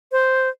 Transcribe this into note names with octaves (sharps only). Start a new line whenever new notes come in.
C5